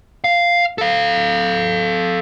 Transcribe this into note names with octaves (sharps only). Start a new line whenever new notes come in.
F5
A4 F5